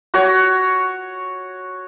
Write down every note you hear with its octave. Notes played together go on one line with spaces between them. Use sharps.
F#4 C#5